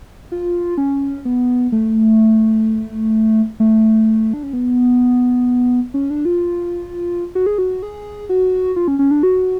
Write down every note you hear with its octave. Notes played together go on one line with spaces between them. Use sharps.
F4
C#4
B3
A3
A3
D4
C#4
B3
C#4
D4
F4
F#4
G#4
F#4
G#4
F#4
F4
C#4
C#4
D4
F#4